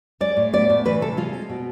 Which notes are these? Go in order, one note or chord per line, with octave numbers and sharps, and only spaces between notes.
G#3 D5
A2
B3 D5
A2
E3 B4
C3 A4
G#3 F4
C4
B2